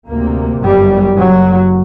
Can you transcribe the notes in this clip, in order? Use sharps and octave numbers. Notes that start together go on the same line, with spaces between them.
D2 C3 A#3
G1 F#2 G3
F#1 F#2 F#3